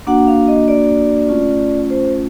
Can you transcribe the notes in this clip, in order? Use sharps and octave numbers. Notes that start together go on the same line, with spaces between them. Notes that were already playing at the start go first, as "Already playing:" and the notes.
A#3 D4 F#4 F#5
F5
D#5
D5
A3 C#4 F4
C5